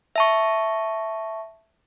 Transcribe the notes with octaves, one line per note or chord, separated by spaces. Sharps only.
E5 A5 C#6